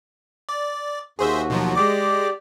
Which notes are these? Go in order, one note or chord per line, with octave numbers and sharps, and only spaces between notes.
D5
D#2 F#4 G#4 C5 E5
B2 F3 F#3
G#3 G4 D5 D6